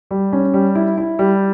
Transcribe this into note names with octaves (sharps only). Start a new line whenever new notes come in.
G3
C#4
G3
E4
E4
G3